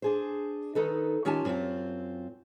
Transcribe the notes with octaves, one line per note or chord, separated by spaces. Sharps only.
D4 G#4 C5
D#3 D#4 A4 B4
D#3 C#4 F4 G4 G#5 A5
F#2 C4 F4